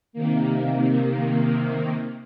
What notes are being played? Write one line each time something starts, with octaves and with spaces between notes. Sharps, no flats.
C3 D#3 A#3